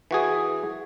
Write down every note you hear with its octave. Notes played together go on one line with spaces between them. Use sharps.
E3 F#4 G#4